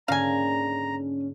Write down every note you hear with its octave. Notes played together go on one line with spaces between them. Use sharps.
G#2 D3 A#3 C#4 F5 G#5 A#5